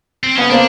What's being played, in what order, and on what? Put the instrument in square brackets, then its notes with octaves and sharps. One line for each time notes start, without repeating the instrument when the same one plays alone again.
[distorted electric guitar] C4
[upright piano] B3 [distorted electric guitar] C#4
[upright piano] A#3 C4 [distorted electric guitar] D4